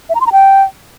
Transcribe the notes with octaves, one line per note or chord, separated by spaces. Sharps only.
E5
A#5
C6
A#5
G5